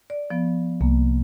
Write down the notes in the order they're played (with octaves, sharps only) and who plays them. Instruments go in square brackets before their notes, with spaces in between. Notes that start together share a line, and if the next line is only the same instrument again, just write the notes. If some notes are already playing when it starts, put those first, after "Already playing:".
[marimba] D5
F3 B3
[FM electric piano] C2 [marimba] A#3